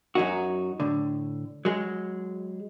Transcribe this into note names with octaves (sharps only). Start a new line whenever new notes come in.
F#2 F#3 D#4 F#4
A2 D3
F#3 G#3